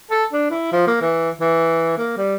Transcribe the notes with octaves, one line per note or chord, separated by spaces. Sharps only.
A4
D4
E4
F3
A#3
E3
E3
A#3
G3